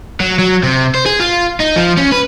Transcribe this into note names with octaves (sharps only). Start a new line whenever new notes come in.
F#3
F#3
C3
C5
G#4
F4
D#4
F3
C#4
B4